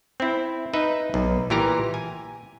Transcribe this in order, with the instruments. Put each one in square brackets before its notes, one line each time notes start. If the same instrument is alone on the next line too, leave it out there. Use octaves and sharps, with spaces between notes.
[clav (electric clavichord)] C4 E4
D#4 B4 E5
B1
A#2 E3 G4 A#4 A#5
G#5